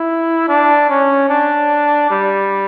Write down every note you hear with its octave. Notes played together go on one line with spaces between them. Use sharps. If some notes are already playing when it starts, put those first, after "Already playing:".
Already playing: E4
D4
C#4
D4
G3